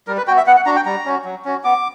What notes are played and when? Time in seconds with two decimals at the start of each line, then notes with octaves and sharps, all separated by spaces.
0.08 G3 A#4
0.17 B4
0.27 B3 F#4 G5
0.37 E5
0.47 B3 F#5
0.57 F#5
0.66 D4 F#4 A#5
0.76 G5
0.86 G3 A#5
1.06 C#4 F#4
1.25 F#3
1.45 C#4 F#4
1.64 B3 D6